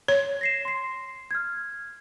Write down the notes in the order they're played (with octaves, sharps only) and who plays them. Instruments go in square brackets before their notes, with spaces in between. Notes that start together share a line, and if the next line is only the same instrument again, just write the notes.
[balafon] C#5
[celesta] A#6 C7 E7
C6 C7
F6 G#6